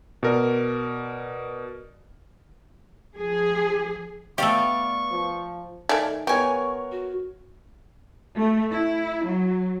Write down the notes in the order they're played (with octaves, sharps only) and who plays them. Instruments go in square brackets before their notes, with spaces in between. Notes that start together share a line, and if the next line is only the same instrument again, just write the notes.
[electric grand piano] B2 A#4 D5
[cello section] F3 G#4
[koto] A3 G4 [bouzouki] B3 D5 F5 [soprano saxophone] C#6
[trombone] F3
[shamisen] D#3 A3 [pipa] D5 G#5
[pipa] F#3 G#5 [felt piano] B3 A#4 C#5 [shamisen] G4 [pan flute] C#6
[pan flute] F#4
[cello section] A3
E4
F#3